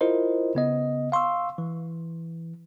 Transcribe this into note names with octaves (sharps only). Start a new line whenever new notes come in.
E4 F4 A#4 C5 D#5
C#3 B3 D#5
F5 C6 C#6 E6
E3